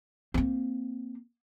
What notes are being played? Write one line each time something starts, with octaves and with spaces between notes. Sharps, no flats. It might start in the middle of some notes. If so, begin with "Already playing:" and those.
A#3 C4